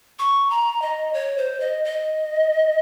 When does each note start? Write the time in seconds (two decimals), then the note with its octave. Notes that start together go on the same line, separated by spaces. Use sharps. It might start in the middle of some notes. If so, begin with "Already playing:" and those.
0.19 C#6
0.50 A#5
0.82 D#5
1.14 C#5
1.38 C5
1.60 D#5
1.85 D#5